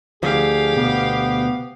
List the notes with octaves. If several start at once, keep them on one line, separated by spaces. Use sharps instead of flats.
D2 F3 G4 G#4 F5
B2 B3